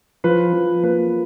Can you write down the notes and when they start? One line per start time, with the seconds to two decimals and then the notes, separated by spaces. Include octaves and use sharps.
0.24 F3 B4
0.53 F3
0.83 A#3 B4